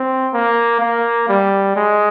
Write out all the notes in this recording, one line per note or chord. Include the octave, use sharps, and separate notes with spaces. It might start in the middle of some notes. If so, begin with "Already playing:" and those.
Already playing: C4
A#3
A#3
G3
G#3